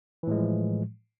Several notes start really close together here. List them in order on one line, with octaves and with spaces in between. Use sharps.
E3 A2 G#3 F3